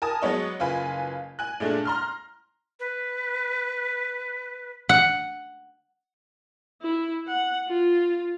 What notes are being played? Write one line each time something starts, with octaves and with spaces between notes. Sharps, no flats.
A#4 G#5 A5 D#6
F#3 G#3 B3 C#5 D#5
F#1 F4 B4 G#5
G#5 F#6
A#2 G#3 A3 D4
A#5 C6 F6
B4
F#5
E4
F#5
F4